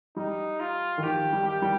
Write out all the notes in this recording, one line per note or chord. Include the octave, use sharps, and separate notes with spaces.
G3 D#4
F4
D#3
F3 G4
G3
G4
G3